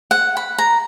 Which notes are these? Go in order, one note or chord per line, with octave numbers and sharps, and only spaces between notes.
F#5
B5
A#5